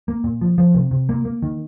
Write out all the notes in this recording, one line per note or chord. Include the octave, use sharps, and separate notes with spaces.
A#3
A#2
F3
F3
C3
C3
A#3
A#3
D#3